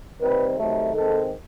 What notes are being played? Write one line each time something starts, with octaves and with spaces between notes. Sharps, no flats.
C3 D#3 G3 C4 B4
C3 D#3 F#3 A3
D#3 G#3 C4 A4